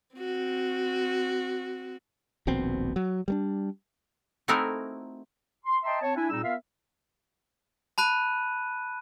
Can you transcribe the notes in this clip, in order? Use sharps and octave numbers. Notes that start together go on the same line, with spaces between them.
C4 F#4
D#1 A#1 B2 C4
F#3
G3 A3 D4
A3 C4 D#4 E4 F#4 A#4
C6
D#5 E5 G5 A5 A#5 C6
C4 C#5 A5
D4 E4 E5 G#5
A#2 G3 C4 D#4 G#4 E6
B3 F4 A#4 E5 F5
A5 B5 F#6 D#7